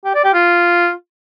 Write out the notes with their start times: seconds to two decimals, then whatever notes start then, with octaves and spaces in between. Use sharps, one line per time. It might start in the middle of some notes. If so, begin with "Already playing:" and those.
0.05 G4
0.14 D5
0.24 G4
0.34 F4